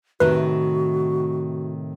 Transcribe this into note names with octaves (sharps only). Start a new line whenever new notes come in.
A2 C3 D#3 F#4 B4